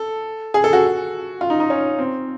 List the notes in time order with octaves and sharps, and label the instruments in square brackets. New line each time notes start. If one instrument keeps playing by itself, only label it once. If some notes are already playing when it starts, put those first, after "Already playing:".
Already playing: [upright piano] A4
G#4
A4
F#4
F4
D#4
D#4
C#4
C4